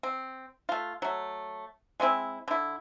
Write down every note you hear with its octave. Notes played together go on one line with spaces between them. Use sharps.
C4
A3 F4
F#3 A3
G#3 A3 C4 E4
D3 E4